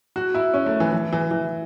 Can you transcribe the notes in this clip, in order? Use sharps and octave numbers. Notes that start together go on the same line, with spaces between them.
F#4
E4
C#4
A3
E3
E3
E3
E3